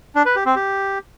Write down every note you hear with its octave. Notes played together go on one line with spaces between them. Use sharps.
D4
B4
G4
C4
G4